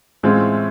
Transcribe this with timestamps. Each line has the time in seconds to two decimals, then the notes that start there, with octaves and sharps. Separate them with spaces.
0.23 A2 E3 G#3 C4 F4